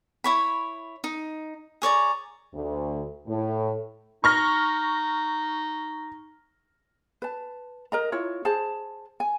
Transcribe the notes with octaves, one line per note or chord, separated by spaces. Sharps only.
E4 C#5 B5
D#4
G#4 C#5 D5 A#5
D2
A2
D#4 C#6 F6 A#6
B4 A5
A#4 D#5 A#5
E4 F4 C#5
G#4 C5 A5
G#5